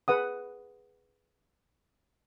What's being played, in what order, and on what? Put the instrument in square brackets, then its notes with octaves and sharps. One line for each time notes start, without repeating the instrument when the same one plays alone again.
[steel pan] G#4 B4 F#5 D#6